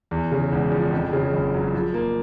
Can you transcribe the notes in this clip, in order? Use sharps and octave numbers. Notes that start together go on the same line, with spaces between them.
E2
C#3
E1
F3
F2
C#3
F#1
F#3
F3
A#3